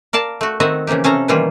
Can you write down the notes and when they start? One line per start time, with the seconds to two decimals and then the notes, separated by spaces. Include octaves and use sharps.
0.13 A#4 D5 F5 A5
0.41 A3 F#4
0.60 D#3 C4 F#4 D#5 E5
0.87 C#3 E3 F3 A#3 G4
1.04 C3 C#4 A4 F5 A#5
1.28 B2 D#3 E3 G3 A#3 F4